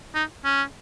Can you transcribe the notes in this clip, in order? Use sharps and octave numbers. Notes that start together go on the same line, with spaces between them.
D#4
C#4